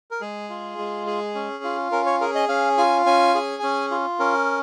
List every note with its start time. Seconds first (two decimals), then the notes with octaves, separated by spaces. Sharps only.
0.11 A#4
0.21 G#3 G#4
0.50 F4
0.78 G#3
1.07 G#4
1.35 C#4
1.64 F4
1.92 C#4 A#4
2.06 C#5
2.21 G#4 A#4
2.35 D#5
2.49 C#4 F5
2.77 F4 G#5
3.06 C#4 G#5
3.35 G#4
3.63 C#4
3.91 F4
4.19 C#4 A#4